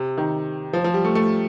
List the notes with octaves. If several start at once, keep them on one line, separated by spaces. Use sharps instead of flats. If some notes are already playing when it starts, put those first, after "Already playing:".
Already playing: C3
D#3
F3
F3
G3
A3
A3